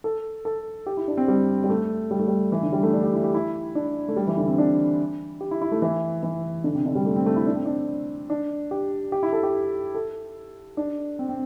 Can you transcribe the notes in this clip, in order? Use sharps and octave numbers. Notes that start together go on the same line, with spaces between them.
A4
A4
G4
E4
D4
C4
G3
G3
A3
G3
A3
G3
E3
D3
G3
A3
D4
G4
E4
G4
E4
D4
A3
G3
E3
D3
C4
D4
G4
E4
E4
A3
E3
E3
D3
C3
D3
G3
A3
C4
A3
E4
D4
C4
D4
D4
G4
G4
E4
A4
G4
A4
D4
C4
C4